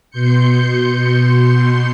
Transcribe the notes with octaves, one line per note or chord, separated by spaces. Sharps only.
B2 C6 G6 C#7